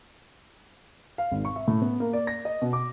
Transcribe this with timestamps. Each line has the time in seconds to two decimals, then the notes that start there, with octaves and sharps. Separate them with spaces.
1.18 F5
1.31 G#1
1.45 C#6
1.56 E5
1.68 A2
1.82 B3
2.00 A#3
2.13 D5
2.27 A#6
2.45 D#5
2.62 B2
2.73 D6